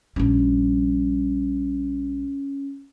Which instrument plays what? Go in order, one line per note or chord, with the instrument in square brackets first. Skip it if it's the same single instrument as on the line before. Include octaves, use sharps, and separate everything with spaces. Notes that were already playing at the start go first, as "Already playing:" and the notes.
[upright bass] A#1 G3 [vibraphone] C#4